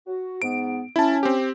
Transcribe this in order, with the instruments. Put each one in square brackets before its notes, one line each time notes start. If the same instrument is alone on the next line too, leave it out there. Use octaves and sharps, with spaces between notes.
[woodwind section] F#4
[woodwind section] G#2 B3 [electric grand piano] D7
[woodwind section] C#4 [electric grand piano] E4 A5
[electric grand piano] C4 G4